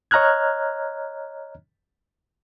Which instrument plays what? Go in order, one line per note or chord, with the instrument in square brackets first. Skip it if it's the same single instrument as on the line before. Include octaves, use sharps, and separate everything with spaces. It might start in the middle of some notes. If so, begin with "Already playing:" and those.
[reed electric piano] C#5 D#5 A#5 F6 F#6 G#6